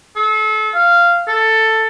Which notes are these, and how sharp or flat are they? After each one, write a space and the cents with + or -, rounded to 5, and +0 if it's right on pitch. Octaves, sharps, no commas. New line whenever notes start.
A4 -35
F5 -10
A4 +10